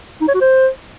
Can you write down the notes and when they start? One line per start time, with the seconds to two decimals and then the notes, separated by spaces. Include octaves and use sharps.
0.21 D#4
0.28 C#5
0.34 F#4
0.41 C5